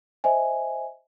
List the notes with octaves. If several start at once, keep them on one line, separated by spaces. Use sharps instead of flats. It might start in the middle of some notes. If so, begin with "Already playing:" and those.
C5 D#5 E5 G#5